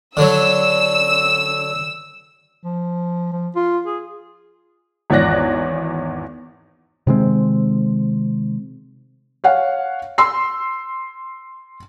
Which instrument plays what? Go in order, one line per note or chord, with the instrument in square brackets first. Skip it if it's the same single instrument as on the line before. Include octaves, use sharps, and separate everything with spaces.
[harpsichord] D3 F#3 [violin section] E6
[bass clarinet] F3
F3
F4
G#4
[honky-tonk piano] G#1 E2 C#5 D5 F#6 A#6
[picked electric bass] C3 D#3 G#3 C4
[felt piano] C#5 F5 F#5
C6 E6 C7